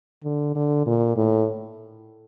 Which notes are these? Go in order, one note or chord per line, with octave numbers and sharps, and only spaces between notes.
D3
D3
A#2
A2